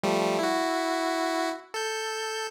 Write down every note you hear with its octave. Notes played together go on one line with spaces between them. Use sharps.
F3 G3 A3
E4 F#4
A4 G6